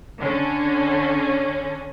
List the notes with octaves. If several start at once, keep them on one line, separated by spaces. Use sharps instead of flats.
D3 C#4